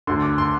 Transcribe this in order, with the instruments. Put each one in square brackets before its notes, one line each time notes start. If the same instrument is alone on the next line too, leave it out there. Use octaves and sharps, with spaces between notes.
[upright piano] D2 D3 C6
D6
C6